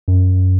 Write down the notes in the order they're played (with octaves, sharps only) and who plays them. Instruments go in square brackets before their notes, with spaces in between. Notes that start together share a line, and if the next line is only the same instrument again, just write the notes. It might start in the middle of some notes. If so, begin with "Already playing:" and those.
[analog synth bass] F#2